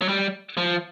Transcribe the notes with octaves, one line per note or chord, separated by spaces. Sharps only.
F#3
G3
F3